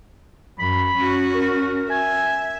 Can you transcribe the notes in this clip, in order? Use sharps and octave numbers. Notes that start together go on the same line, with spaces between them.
F#2 B5
C#4 F#4
A#4
E5 G#5